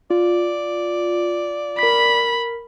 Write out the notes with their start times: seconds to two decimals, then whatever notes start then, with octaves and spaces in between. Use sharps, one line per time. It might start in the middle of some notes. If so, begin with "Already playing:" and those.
0.10 F4 D5
1.79 A#4 B5 B6